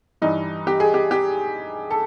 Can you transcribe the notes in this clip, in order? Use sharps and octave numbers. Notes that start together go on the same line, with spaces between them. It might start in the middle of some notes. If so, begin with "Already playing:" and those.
G2 E3 G3 D#4
G4
G#4
G4
G4
A4